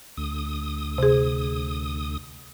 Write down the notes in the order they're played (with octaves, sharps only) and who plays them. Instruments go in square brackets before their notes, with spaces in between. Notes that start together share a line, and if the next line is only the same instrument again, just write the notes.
[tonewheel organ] D2 D#6
[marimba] C3 G#4